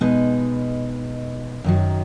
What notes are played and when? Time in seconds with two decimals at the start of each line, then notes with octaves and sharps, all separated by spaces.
0.01 B2 G#3 D#4 B4 D#5
1.64 F#2 D#3 F#3